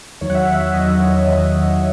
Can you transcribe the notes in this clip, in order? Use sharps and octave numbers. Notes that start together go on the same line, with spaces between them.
E2 D#3 F#3 C#5
F#5
E5
E5
E5
E2 D#3 F#3 D#5
C#5
E5
E2 D#3 F#3 D#5